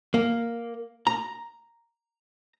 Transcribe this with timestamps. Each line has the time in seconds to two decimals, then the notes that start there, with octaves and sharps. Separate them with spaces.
0.14 A#3
1.07 A#5